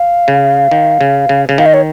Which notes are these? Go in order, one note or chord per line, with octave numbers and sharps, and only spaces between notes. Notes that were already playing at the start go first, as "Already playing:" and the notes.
Already playing: F5
C#3
D#3
C#3
C#3
C#3
D#3 F5
D#5
C#5